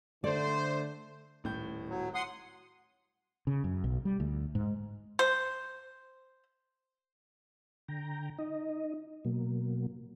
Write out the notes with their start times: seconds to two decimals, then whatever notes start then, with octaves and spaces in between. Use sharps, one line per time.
0.24 D3 A3 C5 D5
1.44 D#1 A2 G6
1.89 F#3
2.15 F#5 C6 D#6
3.47 C#3
3.64 F#2
3.84 B1
4.05 G3
4.20 D2
4.55 G#2
5.19 C5
7.88 D3 G5 A#5
8.38 D#4 D#5
9.25 B2 F#3 A#3